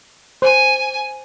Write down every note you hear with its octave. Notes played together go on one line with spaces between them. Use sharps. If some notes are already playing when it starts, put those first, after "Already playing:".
C5 G#5